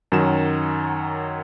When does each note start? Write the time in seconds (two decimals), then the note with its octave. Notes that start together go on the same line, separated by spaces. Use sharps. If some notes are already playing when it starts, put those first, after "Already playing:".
0.12 F#2 D#3 F#3 E7